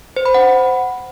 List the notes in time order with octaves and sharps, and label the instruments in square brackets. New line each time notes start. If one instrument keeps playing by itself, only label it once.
[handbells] C5
B5
F#5